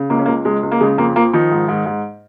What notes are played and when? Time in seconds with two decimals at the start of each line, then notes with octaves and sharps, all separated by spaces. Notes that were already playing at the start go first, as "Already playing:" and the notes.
Already playing: C#3
0.10 C#2 A#3
0.19 C#4
0.26 C#2 A#3
0.45 C#2 G#3
0.63 C#2
0.71 A#3
0.81 C#3 G#3
0.98 F2 A#3
1.16 F3 A#3
1.33 D#3 F3 D#4
1.51 G#2
1.68 G#2
1.86 G#2